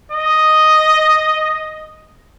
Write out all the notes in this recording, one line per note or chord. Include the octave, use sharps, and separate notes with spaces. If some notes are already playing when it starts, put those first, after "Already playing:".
D#5